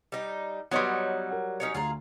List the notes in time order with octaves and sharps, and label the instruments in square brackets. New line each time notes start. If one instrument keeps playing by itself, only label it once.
[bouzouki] G3 D#4
[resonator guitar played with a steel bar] F#3 G3 [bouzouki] B3 D#4 C#5 [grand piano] B4 D#5 C6
[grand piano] A#4 F#5
[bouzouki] C#4 D#4 C#5
[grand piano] D2 [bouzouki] F4 G#4 A#5